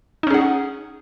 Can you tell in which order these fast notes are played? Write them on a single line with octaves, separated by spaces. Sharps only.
D#4 C#4 G#4 F#5